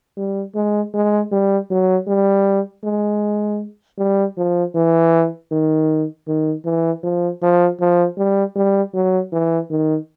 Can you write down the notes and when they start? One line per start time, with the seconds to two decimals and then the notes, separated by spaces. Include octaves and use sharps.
0.17 G3
0.55 G#3
0.94 G#3
1.32 G3
1.71 F#3
2.08 G3
2.84 G#3
3.99 G3
4.37 F3
4.75 E3
5.52 D#3
6.28 D#3
6.65 E3
7.03 F3
7.42 F3
7.80 F3
8.18 G3
8.56 G3
8.94 F#3
9.32 E3
9.70 D#3